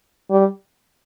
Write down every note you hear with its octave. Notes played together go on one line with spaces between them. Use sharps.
G3